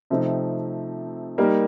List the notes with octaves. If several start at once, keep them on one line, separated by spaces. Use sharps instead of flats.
C3 F3 A3 C4 D#4
G3 A#3 D#4 G4 A#4